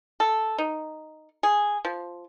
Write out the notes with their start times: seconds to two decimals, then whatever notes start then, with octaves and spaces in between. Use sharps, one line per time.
0.20 A4
0.58 D#4
1.43 G#4
1.85 F3